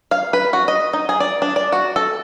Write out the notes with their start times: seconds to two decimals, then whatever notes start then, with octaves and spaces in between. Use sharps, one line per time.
0.11 F5
0.33 B4
0.53 F#4
0.68 D#5
0.93 D#4
1.09 G#4
1.20 D5
1.42 D4
1.56 D5
1.72 F#4
1.96 A4